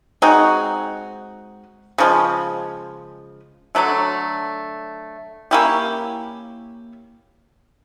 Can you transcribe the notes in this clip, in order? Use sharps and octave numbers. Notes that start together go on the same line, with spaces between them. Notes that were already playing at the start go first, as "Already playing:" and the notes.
G#3 C4 D#4 F#4
C#3 F3 G#3
D3 F#3 A3
A#3 C#4 E4 G4